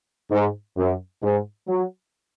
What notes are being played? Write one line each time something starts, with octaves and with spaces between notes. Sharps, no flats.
G#2
F#2
G#2
F#3